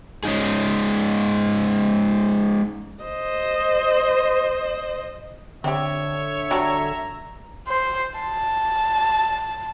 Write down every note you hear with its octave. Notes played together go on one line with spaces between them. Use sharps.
G#3 C#4 D#4 G#4
C5 D#5
D3 C4 G4 C#5 E5
F#3 G3 D4 A#5
C5
A5